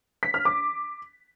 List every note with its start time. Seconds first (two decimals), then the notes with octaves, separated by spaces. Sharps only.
0.23 B6
0.34 F6
0.45 D6